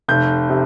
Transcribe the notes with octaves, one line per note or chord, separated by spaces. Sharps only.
F1 G6
C3